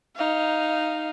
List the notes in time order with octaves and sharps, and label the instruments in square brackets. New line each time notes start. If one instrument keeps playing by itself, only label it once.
[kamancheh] D#4 F5